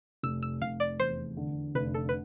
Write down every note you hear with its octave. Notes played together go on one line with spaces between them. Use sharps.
F1 E6
E6
F1 F5
D5
E2 C5
D3
F1 B4
A4
B4